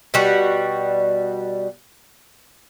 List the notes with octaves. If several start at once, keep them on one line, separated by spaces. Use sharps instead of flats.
B2 G3 F#4